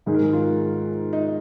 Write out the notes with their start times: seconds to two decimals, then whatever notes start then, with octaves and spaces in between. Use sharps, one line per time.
0.06 G#2 D#3 G#4
0.14 A#4
0.22 G#4
0.33 F4
1.13 D#4